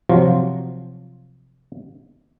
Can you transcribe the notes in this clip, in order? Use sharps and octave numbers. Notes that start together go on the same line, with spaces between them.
C3 F3 F#3 F4